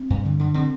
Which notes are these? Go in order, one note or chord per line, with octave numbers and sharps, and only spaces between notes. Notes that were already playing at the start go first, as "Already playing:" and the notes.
Already playing: C4
G2
D3
D3
D3 C4